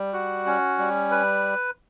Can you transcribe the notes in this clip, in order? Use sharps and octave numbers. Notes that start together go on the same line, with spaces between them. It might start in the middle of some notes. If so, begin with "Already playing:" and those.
Already playing: G3
F#4
C#4
G3
B4